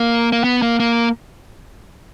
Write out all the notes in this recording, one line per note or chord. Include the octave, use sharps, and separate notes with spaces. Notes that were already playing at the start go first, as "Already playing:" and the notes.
Already playing: A#3
A#3
B3
A#3
A#3